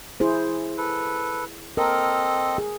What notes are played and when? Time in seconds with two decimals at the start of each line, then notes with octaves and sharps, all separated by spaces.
0.20 E4 G#4 C5
0.78 A4 B4
1.77 C4 A4 A#4 D#5
2.58 G#4